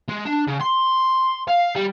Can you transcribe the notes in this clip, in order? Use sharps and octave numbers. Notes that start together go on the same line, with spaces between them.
G#3
D4
C#3
C6
F5
G3